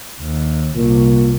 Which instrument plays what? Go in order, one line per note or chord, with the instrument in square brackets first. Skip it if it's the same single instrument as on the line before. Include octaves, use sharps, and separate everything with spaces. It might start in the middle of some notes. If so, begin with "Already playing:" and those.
[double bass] D#2
[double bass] C2 [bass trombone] A#2